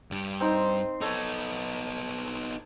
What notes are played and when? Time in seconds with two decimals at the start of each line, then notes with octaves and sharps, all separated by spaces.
0.11 G2 G3
0.40 C4 D#4 C5
1.01 B3 D#4 A4 C#5